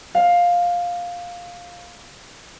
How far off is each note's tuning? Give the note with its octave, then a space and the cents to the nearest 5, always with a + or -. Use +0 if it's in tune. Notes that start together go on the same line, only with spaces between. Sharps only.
F5 +10